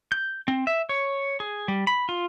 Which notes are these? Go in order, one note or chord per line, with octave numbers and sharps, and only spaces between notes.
G6
C4
E5
C#5
G#4
G3
B5
F4